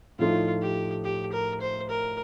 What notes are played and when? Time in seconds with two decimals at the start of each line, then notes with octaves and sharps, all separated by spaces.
0.19 A2 F3 A3 D#4 F4
0.62 G4
1.04 G4
1.33 A#4
1.61 C5
1.90 A#4